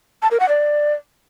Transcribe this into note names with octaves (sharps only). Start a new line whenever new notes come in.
A5
A#4
F#5
D5